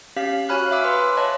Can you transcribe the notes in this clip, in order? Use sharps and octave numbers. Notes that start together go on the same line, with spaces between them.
C#4 G4 F5 B6
F#4 C#5 G#5 B5 F6 F#6
E5 F5 G#5 D6 E6
B4 C6
C#5 D#5 A5